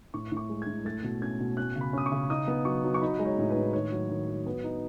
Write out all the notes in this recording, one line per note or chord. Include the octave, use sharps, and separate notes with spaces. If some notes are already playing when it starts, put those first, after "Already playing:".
A2 C#6
A2
C#6
G#3
A2 G#6
A3 A6
B2
C#4 G#6
B2
C#4 F#6
C#3
B5
C#4 D#6
C#6
C#3
D#4 D#6
B3
F#3 C#6
F#3
C#6
D#4 B5
G#3 D#5
C#5
A2
B4
A2
D#3 C#5
F#3
D#3
F#3
B3 B4
D#4